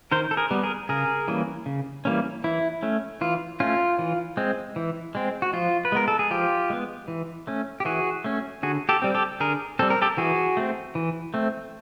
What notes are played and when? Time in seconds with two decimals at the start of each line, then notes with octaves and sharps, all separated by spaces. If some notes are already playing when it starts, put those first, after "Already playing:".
0.12 D#3 A#4 C5
0.31 A4
0.37 G#4 A#4
0.51 G3 B3
0.63 G#4 A#4
0.89 C#3 G#4 A#4
1.28 E3 G3 A#3 C#4
1.66 C#3
2.05 E3 G3 A#3 C#4
2.44 E3 E4
2.83 A3 C#4
3.21 E3 F4
3.60 A3 C#4 F4
3.99 E3
4.37 G#3 C4
4.76 E3
5.15 G#3 C4
5.42 F#4
5.53 F3 F4
5.85 B4
5.92 G#3 B3 A#4
6.08 A4
6.19 G#4
6.31 F3 F4 G4
6.70 G#3 B3
7.08 E3
7.47 A3 C#4
7.80 G4
7.85 E3 F#4 G#4
8.24 A3 C#4
8.63 D3 F#4 G#4
8.89 G4 A4
9.02 G3 C4
9.15 G4 A4
9.40 D3 G#4 A#4
9.79 G3 C4 A4
9.90 A#4
10.02 G4 A4
10.17 E3 F#4 G#4
10.57 A3 C4
10.95 E3
11.34 A3 C4